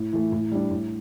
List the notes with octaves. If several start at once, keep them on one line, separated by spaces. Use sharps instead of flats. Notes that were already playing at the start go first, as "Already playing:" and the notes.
Already playing: A2
E3 A3
A2
G3 D4
A2